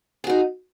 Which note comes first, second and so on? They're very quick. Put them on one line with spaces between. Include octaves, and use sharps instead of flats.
G#4 F#4 D#4